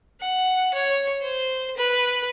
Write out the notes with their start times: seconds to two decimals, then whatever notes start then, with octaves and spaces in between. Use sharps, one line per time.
0.20 F#5
0.74 C#5
1.21 C5
1.77 B4